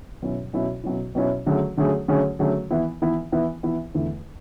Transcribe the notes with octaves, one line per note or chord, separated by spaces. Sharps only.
B2 F#3 C#4 E4
B2 F#3 C#4 E4
B2 F#3 C#4 E4
B2 F#3 C#4 E4
D3 F#3 A3 C#4 G#4
D3 F#3 A3 C#4 G#4
D3 F#3 A3 C#4 G#4
D3 F#3 A3 C#4 G#4
E3 B3 E4
E3 B3 E4
E3 B3 E4
E3 B3 E4
E2 D3 A3 E4